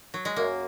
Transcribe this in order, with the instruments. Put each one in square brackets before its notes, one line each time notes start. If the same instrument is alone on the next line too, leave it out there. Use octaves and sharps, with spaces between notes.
[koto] F#3
G#3
[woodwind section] F#2 [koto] A#3